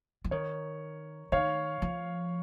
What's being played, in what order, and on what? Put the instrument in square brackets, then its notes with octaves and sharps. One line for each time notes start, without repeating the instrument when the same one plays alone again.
[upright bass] F3
[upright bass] D#3 [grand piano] A#4 C#5
[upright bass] D#3 [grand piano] C#5 F5
[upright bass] F3